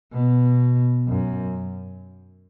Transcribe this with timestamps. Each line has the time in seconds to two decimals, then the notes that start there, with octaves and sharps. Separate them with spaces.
0.13 B2
1.08 F#2